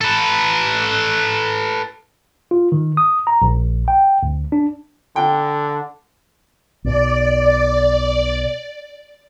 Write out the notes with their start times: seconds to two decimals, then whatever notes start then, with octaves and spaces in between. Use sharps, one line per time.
0.01 A4 B4
2.51 F4
2.72 D#3
2.97 D#6
3.27 A#5
3.42 A#1
3.88 G5
4.23 D2
4.52 D4
5.16 D3 G5
6.84 B1 B2 D5